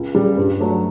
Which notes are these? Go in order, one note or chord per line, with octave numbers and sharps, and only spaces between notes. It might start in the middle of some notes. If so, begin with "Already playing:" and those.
Already playing: C#2
C#3 G3
G2
F#3 A3